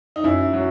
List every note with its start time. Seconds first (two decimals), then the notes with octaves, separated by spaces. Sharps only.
0.16 D#4
0.24 F#2 E4
0.53 F#3